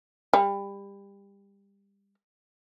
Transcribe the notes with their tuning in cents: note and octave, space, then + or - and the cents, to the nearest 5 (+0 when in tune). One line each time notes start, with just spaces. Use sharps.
G3 +25